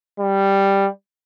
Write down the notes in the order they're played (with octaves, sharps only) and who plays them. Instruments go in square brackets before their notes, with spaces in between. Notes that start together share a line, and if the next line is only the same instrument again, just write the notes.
[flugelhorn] G3